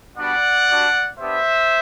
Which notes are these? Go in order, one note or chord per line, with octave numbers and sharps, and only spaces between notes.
G3 B3 D4 F#4 D5 F#5
G3 D4 F#4
B3 D4 G4 C5 E5